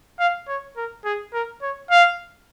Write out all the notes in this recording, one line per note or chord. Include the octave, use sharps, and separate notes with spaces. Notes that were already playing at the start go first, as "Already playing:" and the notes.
F5
C#5
A#4
G#4
A#4
C#5
F5